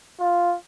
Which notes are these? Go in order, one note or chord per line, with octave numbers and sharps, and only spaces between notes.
F4